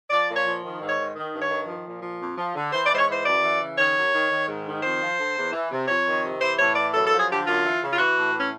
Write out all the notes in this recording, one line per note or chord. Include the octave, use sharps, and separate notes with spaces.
F3 D5
A#2
C#5
F3
D#3
G#2
C#5
D#3
D#3
G2
C#5
D#3
F3
A#2
F3
F2
F3
D3
E3 C5
D5
G#2 C5
C#5
E3 C5
F#2 D5
E3
C#3
D#3 C#5
F#2
D#3
D#3
G#2
D#3
F2 C5
F3
D3
E2
E3
C3
F2 C#5
D#3
C3
E3 C5
A2 C#5
E3 D5
F#2 A4
A4
F3
G#4
D3 G4
F#2 F4
E3
C#3
F4
E3 F#4
A2
E3
C#4